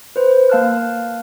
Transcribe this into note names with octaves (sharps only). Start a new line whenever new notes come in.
B4 C5
A#3 F5 A5 F6 F#6